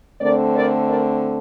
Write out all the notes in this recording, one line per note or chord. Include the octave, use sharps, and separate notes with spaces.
D3 A3 C4 A#4 D5
A#4 D5
A#4 D5